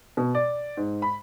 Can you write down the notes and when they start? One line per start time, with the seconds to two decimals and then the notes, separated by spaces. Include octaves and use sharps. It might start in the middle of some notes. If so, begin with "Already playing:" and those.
0.17 B2
0.35 D5
0.77 G#2
1.02 B5